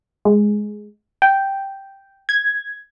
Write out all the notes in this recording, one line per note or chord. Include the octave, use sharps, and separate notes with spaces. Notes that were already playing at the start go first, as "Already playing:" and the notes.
G#3
G5
G#6